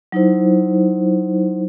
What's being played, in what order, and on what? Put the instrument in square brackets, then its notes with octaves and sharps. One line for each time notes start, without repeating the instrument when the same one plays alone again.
[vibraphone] F#3 D#4 E4 C5